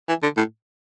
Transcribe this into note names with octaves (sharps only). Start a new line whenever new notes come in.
E3
D3
A2